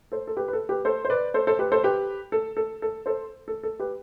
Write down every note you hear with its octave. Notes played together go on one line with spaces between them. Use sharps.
A4 C5
A4
G4 B4
B4
A4
G4 B4
A4 C5
C5
B4 D5
A4 C5
A4 C5
G4 B4
A4 C5
G4 B4
A4
A4
A4
A4 C5
A4
A4
G4 B4